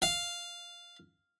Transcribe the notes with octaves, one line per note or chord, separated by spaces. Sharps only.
F5